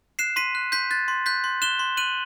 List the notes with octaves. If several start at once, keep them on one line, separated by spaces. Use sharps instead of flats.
F#6 C7 E7
C6 B6 D#7
F#6
C6 G6 B6
F#6 A6
C6
F#6 G6 B6
C6
F#6 E7 G7
C6
F#6 D#7 F#7